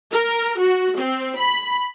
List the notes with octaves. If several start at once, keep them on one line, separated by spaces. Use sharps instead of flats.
A#4
F#4
C4
B5